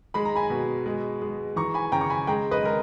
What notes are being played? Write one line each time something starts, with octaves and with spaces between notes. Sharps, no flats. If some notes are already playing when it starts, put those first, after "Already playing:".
G#3 B5
A#5
G#5 B5
B2
G#3
G#3
E3 A#5 C#6
G#5 B5
C#3 G5 A#5
C#6
G#5 B5
G#3 G5 A#5
B4 D#5
G#3 A#4